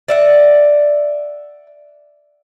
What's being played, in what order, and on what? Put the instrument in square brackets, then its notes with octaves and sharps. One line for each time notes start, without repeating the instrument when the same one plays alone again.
[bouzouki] D5 E5 F#5